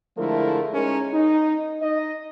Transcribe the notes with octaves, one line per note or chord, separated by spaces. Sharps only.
D3 F3 G#3 A3 E4 A#4
G#3 C#4 D#4 G#4 A#4
D#4
D#4 D#5